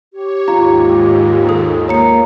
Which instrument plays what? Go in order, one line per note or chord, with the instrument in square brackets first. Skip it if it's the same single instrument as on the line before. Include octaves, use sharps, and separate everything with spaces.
[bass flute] G4 [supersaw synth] C#5
[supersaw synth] D#2 G#2 [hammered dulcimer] F4 [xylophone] A#5
[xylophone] G#4 A4 D#6
[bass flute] A#3 [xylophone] C#5 A#5 C#7